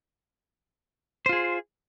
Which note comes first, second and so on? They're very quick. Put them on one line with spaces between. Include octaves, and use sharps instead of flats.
C5 F4 G#4